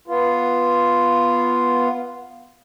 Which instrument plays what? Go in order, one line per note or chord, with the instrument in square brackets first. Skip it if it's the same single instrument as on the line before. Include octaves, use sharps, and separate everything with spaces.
[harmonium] B3 F4